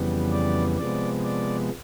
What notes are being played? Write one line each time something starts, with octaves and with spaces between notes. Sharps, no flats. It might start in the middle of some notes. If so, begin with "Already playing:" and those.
Already playing: F2 C#3 E3 G3 B3
D5
C3 F3 G#3 B3 D5
D5